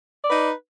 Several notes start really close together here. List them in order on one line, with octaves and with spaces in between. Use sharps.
D5 B4 D#4